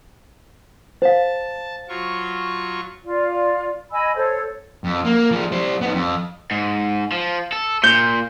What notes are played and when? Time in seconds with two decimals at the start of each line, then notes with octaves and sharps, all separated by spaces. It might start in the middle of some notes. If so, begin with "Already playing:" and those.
1.02 C5 F5 A5
1.89 F#3 F4 C#6
3.05 F4 D5
3.92 D#5 G#5 B5 E6
4.15 A4 C5 C#5
4.84 F2
5.05 A#3
5.31 F3 G#4
5.52 G3 C5
5.81 B3 D#4
5.94 F2
6.51 G#2
7.12 F3
7.53 A4
7.83 A#2 G6